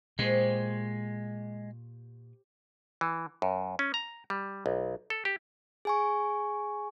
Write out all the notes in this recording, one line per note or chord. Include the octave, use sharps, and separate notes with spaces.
A#2 G#3 G4 C5 C#6
E3
F#2
C#4
A#5
G3
B1
A4
G4
G#4 G#5 C#6